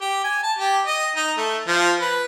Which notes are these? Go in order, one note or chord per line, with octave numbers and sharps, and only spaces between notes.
G4
G#5
A5
G4
D#5
D#4
A3
F3
B4